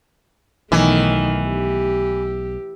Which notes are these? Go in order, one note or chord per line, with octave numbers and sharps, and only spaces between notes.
B1 B2 D#3 E3 A3
G4